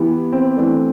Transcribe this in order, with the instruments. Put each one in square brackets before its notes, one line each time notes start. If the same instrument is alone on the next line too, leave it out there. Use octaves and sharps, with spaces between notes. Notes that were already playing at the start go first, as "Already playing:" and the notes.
Already playing: [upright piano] E3 B3 E4 G4
[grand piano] C4
[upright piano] E3 A3 D4